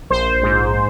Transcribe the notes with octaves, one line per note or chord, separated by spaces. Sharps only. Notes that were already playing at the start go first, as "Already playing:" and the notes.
A#1 C5
G#2